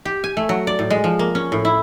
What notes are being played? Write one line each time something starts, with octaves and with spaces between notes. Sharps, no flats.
G4
G#5
A3
F#3
D5
A2
G#3
F3
A#3
C#4
A2
E4